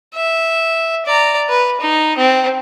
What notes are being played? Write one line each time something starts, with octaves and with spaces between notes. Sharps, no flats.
E5
D5 A#5
B4
D#4
C4